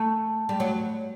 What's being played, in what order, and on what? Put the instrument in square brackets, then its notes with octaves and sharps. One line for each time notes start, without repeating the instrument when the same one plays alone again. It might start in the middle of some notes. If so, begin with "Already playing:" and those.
Already playing: [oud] A3
G3
F#3